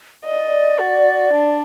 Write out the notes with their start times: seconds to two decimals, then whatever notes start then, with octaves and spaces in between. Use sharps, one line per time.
0.25 D5 D#5
0.80 F#4
1.33 D4